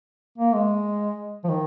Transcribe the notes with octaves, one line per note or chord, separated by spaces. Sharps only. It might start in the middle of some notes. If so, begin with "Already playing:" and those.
A#3
G#3
F3
D#3